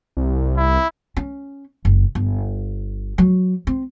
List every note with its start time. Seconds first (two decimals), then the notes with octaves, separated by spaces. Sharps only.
0.17 C2
0.57 E4
1.17 C#4
1.85 F#1
2.15 G1
3.18 F#3
3.67 C4